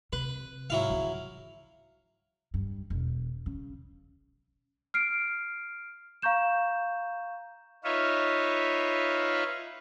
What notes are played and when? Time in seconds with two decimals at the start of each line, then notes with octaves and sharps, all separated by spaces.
0.13 C3 B4
0.70 G#2 F#3 E4 F5
0.90 C#3 E3
2.54 G2
2.90 E1
3.46 C#3
4.94 F6 C7 D7
6.22 F5 A#5 C#6 G6 E7
7.84 D#4 F4 B4 C#5 E5 F5